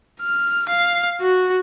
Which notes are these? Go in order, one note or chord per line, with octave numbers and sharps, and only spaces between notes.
F6
F5
F#4